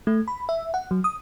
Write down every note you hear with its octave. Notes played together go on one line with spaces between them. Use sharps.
A3
B5
E5
F#5
F#3
D#6